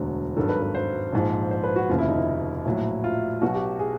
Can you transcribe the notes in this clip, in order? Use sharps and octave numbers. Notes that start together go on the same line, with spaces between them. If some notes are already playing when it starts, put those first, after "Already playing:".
Already playing: E1 D2 D3 F#3
G#1 G2 D#3 F#3 A4
B4
B4
C5
A#1 G#2 F3
C5
B4
F#4
F1 D#2 C#3 F4
E4
D#4
E4
A#1 A2 F#3
F4
B1 B2 F#3 F#4
G4
G#4